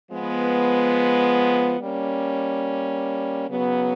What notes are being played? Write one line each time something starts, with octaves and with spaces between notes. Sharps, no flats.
F3 G#3 B3
G3 A#3 C#4
C#3 F#3 B3